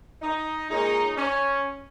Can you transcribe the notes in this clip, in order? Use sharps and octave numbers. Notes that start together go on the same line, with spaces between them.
D#4
A#2 G#3 C#4 D#4
C#4